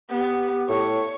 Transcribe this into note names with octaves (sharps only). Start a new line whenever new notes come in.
B3 G4
A2 C#5